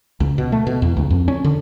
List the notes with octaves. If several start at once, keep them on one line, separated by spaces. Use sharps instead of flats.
C#2
B2
A3
B2
E2
C#2
F2
C#4
D3